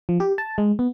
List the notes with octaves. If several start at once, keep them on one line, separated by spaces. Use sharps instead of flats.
F3
G4
A5
G#3
B3